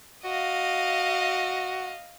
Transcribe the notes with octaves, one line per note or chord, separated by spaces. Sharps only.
F#4 D#5 F5